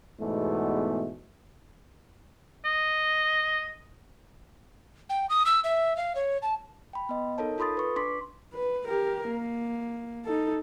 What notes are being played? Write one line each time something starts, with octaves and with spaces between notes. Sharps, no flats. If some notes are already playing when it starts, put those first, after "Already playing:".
E2 G#2 B2 A3
D#5
G5
D#6
E6
E5
F5
C#5
A5
G5 B5
B3 D#5
D#4 A4 A#4 C#5 A5
F4 A4 B5 C6 D#6 A6
B4 C#6
D4 C6 D6 B6
B4
G4 A#4
A#3
D#4 A4